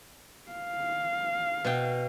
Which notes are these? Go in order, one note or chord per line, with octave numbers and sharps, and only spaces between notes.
F5
B2 G5